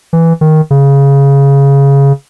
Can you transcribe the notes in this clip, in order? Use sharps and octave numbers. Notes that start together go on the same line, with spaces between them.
E3
D#3
C#3